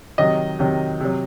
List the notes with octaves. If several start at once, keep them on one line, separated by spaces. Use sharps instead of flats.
C3 D#3 F#3 D#5
C3 D#3 F#3
C3 F#3